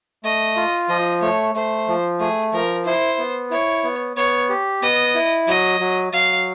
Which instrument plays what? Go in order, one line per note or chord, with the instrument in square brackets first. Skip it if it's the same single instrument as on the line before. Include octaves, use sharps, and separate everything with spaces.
[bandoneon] A3 [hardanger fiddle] D#5
[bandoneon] F4
[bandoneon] F3 [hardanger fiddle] D#5
[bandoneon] A3 [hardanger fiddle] C#5
[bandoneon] A3 [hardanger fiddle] C5
[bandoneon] F3
[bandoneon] A3 [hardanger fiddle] G#4
[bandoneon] F3 [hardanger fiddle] A#4
[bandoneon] E4 [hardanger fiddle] C5
[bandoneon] B3
[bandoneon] E4 [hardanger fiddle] C#5
[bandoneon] B3
[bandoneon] B3 [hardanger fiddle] C#5
[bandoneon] G4
[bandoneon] B3 [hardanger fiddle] D#5
[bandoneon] E4
[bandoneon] F#3 [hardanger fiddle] D#5
[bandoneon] F#3
[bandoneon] F#3 [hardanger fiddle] F5